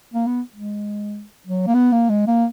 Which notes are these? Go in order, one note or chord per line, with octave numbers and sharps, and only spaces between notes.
A#3
B3
G#3
F#3
A#3
B3
A#3
G#3
A#3